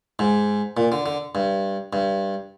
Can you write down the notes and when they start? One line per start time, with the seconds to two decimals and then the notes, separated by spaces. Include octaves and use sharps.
0.19 G#2
0.77 A#2
0.92 D3
1.06 D3
1.35 G2
1.93 G2